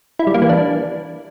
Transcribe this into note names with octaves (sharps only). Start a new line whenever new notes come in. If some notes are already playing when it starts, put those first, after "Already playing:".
E4
G3
A#3
E3
D4